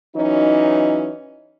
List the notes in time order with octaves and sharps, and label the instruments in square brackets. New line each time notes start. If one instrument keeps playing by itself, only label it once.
[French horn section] E3 F#3 C#4 D#4